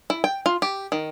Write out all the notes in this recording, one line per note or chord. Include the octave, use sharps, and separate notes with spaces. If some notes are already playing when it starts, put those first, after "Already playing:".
E4
G5
F4
G4
D#3